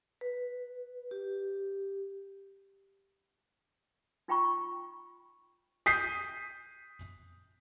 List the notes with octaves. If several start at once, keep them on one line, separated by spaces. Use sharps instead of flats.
B4
G4
D#4 F4 G5 A#5 B5 C#6
D#6 G6 B6 C7